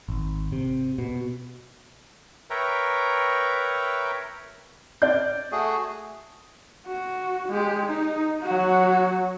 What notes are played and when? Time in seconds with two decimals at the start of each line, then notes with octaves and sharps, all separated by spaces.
0.08 G#1
0.52 C3
0.98 B2
2.50 A#4 B4 C#5 E5 G5 A#5
5.02 D5 G6
5.52 A3 F#4 G#4
6.86 F#4
7.49 G#3 G4
7.86 D#4
8.43 F#3 F#4